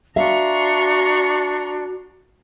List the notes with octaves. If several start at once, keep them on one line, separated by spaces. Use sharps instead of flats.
D4 F#4 E5 F5 A#5 C6 C#6